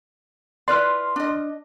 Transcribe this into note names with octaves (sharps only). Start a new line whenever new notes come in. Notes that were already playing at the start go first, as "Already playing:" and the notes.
E4 B4 D5 C6 F6
D4 D#5